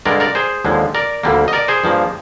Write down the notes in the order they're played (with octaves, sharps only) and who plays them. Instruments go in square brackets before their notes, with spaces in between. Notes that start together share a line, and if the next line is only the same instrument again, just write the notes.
[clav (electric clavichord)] G2 D3 G#3 A#4 D5
A#4 D5
G#4 C5
D#2 D3 F3 G#3
A#4 D5
D2 D3 G3 A#3
D#5
A#4 D5
G#4 C5
G2 F3 A#3